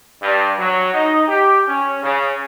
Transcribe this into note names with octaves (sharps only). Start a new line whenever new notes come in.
G2
F#3
D#4
G4
C#4
C#3